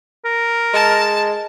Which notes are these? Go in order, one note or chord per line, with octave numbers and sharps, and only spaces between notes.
A#4
G#3 A5